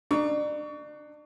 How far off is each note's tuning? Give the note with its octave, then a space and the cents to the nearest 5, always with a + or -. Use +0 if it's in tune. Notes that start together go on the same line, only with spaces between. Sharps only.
D4 +35 A#5 +0 C#6 +35